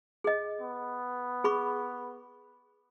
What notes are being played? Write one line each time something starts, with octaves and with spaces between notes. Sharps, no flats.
G#4 D#5
B3
G#4 B5 C#6